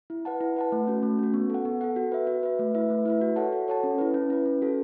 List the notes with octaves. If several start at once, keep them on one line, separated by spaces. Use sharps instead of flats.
E4
B4 F#5 A5
E4
B4 F#5 A5
A3
C#4 F#4
A3
C#4 F#4
B3
A4 F#5
B3
A4 F#5
F#4
B4 E5
F#4
B4 E5
A3
E4 B4 E5
A3
E4 B4 E5
F#4
A4 C#5 F#5 A5
F#4
A4 C#5 F#5 A5
C#4
E4 B4
C#4
E4 B4
C#4
F#4 A4